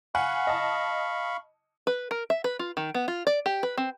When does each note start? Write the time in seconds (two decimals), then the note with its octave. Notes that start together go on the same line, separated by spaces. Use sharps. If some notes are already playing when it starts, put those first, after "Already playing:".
0.15 F5 F#5 G#5 B5 C#6
0.47 D#5 A5
1.87 B4
2.11 A#4
2.30 E5
2.44 B4
2.59 F4
2.77 D#3
2.94 B3
3.08 F4
3.27 D5
3.46 G4
3.63 B4
3.77 C4